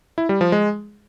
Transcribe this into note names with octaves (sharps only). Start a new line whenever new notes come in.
E4
G3
F3
G#3